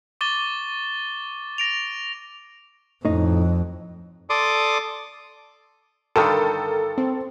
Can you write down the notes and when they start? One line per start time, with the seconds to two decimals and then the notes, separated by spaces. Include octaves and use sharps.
0.21 C#6 D6 A6 G7
1.58 A#6 D7 F7
3.05 F2 A2 D#4
4.30 A4 D5 C6 D6 D#6
6.16 G2 D3 D#3 A4 A#4
6.98 C4